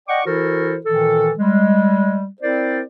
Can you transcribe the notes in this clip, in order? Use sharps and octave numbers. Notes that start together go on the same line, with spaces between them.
D5 D#5 F#5 G5 C#6 D6
E3 E4 F#4 A4 A#4 C5
A#2 D#3 E3 A4
G3 G#3
C4 E4 A#4 C5 D5